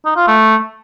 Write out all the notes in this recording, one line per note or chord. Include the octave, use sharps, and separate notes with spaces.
D#4
F4
A3